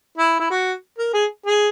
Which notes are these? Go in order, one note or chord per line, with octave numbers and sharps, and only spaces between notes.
E4
E4
F#4
A#4
G#4
G#4